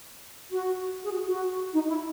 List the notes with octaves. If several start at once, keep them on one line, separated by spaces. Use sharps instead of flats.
F#4
G#4
F#4
F#4
D#4
E4